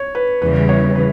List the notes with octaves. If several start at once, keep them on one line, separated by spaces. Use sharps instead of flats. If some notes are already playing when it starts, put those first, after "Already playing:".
Already playing: C#5
B4
E2 C#3 E3 G3 B4
C#5
B4